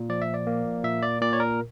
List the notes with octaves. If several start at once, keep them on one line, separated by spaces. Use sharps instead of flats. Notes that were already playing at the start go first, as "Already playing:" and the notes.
Already playing: A#2
F3 D5
E5
D5
A#3
A#2 E5
D5
A#2 D5
C#5
A#4